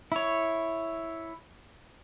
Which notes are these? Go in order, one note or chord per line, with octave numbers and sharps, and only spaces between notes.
E4 C#5